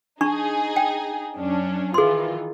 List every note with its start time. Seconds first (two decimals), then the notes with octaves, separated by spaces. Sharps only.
0.21 D4 D#4 G#4 A5 C#6
0.76 G5
1.36 F#2 C#4 D4
1.94 D#3 E3 F4 G#4 C6